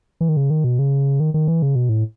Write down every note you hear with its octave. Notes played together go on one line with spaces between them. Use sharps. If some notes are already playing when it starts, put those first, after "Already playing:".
E3
D#3
C#3
D#3
B2
C#3
D#3
D#3
E3
C#3
B2
A2